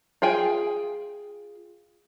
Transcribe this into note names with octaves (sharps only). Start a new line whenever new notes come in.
F4 G#4 G5 G#5